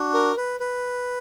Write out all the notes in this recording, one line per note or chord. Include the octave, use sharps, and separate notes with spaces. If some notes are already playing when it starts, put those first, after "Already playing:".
Already playing: D4 F#4
A#4
B4
B4